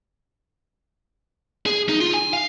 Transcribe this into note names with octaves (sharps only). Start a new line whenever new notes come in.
G#4
D#4
F4
G#5
F5